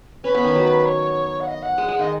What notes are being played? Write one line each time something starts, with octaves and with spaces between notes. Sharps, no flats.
C#4 B4
B3
D#3
F#3
C#5
F#5
D#5
F#5
G#3
G#3
D#3 D#5